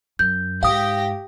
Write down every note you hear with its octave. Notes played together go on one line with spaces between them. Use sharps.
F#2 G6
G#2 G4 F5 G5 D#6 A#6